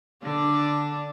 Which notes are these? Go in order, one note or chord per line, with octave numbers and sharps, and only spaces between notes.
D3 D4